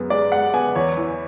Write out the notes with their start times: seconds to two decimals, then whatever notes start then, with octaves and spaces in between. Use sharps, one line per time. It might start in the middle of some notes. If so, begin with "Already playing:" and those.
Already playing: F#2 G#3 B3
0.10 G#3 D5
0.32 G#3 F#5
0.54 B3 G#5
0.75 E2 C#5
0.97 E3